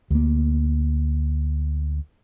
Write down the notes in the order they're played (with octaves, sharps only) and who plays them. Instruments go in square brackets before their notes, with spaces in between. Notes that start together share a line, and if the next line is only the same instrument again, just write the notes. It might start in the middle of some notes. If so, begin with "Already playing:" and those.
[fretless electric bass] D2 A#3